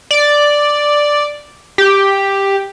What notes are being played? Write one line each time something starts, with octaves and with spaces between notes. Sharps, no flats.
D5
G4